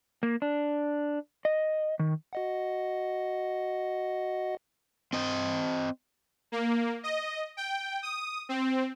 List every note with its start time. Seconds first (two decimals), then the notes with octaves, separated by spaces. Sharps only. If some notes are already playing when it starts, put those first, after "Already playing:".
0.23 A#3
0.42 D4
1.45 D#5
1.99 D#3
2.33 F#4 D#5 F#5
5.13 C4 D#5
6.52 A#3
7.03 D#5
7.57 G5
8.03 D#6
8.49 C4